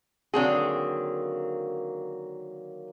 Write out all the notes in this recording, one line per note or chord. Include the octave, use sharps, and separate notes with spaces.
D3 D#3 F#3 A#3 C4 G#4